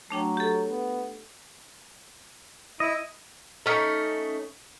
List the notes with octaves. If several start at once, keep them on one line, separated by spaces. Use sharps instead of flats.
F#3 A3 D4 G5
G4 A4
B3
E4 D#5
A3 C#4 D#4